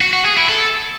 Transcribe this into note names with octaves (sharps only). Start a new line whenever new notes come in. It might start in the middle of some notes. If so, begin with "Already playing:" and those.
F#4
F#4
G#4
E4
A4